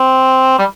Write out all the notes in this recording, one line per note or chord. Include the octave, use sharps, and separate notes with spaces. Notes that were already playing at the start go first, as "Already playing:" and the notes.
Already playing: C4
G3